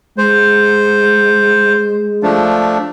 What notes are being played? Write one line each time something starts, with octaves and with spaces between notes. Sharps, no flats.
G#3 C5
F3 A3 D4